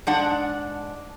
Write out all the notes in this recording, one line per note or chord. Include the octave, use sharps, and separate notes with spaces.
G#2 D4 F#5